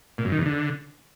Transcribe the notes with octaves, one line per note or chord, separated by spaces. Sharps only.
A#2
F#2
D#3
E2
D3